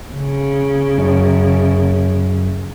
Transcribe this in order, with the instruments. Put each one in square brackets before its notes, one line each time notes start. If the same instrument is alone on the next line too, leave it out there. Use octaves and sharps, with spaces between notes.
[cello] C#3
[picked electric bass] F#2